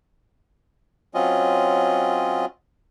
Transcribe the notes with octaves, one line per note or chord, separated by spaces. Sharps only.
F#3 C4 C#4 F4 D#5